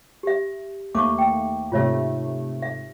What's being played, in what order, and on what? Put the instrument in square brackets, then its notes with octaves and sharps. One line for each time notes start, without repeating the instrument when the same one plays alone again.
[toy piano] G4 E5
[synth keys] D#2 A3 A#3 [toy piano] C#6 D6
[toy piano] G5
[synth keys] G#2 C3 A3 [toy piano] F4 C#5 E5
[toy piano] E5